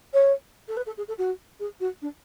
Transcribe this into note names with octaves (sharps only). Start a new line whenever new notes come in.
C#5
A4
B4
A4
G#4
A4
F#4
G#4
F#4
D4